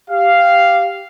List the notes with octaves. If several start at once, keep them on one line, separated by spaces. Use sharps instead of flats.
G4 F5